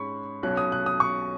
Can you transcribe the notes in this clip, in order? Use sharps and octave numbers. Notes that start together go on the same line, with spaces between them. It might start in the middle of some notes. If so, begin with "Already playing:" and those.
Already playing: G#2 G#3 C#4 B5 C#6
B1 B2 F#3 C#4 F#6
D#6
F#6
D#6
C#6